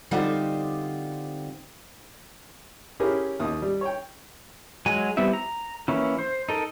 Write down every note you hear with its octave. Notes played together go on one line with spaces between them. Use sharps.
D3 G3 C4 D#4 F4 C5
C#4 E4 G4 G#4 A#4
D#2 D#6
G3
C#5 G5
F#3 G#3 G#5
G3 B3 C4 E4 E5
A#5
E3 A#3 C#4 E4
C5
D#4 A4 A#4